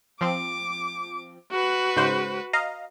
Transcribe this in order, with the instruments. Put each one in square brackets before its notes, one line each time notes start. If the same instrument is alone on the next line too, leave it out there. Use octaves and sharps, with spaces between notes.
[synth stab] F3 C4 [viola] D6
[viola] F#4 B4
[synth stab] G#2 C#3 C5
D#5 F5 A#5